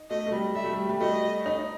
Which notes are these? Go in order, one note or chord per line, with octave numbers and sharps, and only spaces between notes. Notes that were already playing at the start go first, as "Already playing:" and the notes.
Already playing: D#4
A3 D#5
A3
G3
G3 E5
A3
G3
G3
A3 D#5
D#4